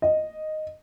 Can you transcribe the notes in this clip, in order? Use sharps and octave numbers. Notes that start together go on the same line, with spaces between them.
D#5